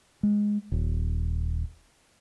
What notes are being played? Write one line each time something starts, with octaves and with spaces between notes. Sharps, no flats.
G#3
D#1